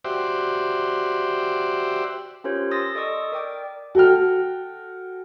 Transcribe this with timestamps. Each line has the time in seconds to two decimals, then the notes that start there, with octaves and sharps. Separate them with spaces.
0.04 F#4 G4 C5 D5 E5
2.44 C#4 F4 G4 A#4 C5 C#5
2.71 C6 D#6 E6 A6 A#6
2.95 A4 D5 D#5 C#6 D#6 E6
3.32 A#4 D5 G5 D6
3.95 F#4 A4 G5 F6